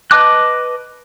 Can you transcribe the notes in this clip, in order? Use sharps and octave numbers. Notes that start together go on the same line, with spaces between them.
B4 D#5 A5 D6 F#6